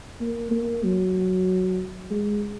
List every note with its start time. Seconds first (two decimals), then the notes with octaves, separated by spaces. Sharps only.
0.20 A#3
0.51 A#3
0.83 F#3
2.10 G#3